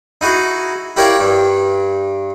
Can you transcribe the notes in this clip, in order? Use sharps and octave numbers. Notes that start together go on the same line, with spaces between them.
D#4 E4 F#4 G#4
E4 G4 A#4 C#5 D5 F5
G2